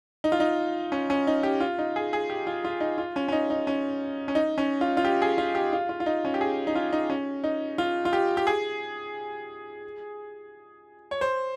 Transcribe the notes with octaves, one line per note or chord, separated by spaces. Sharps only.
D#4
F4
D#4
C#4
C#4
D#4
G4
F4
D#4
G#4
G#4
G4
F4
F4
D#4
F4
C#4
C#4
D#4
D#4
C#4
C#4
D#4
C#4
F4
F4
G4
G#4
F4
G4
F4
F4
F4
D#4
C#4
G4
G#4
D#4
F4
D#4
C#4
D#4
F4
F4
G4
G4
G#4
C#5
C5